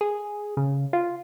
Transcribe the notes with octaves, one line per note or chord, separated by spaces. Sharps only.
G#4
C#3
F4